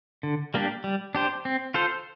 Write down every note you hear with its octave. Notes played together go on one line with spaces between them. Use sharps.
D3
G3 A#3 D4 G4
G3
D4 G4 C5
C4
F4 A4 C5